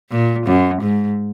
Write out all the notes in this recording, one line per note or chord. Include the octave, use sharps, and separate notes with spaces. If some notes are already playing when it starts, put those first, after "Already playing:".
A#2
F#2
G#2